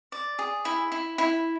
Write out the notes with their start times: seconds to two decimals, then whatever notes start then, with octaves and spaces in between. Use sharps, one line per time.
0.12 D5
0.39 G#4
0.65 E4
0.92 E4
1.18 E4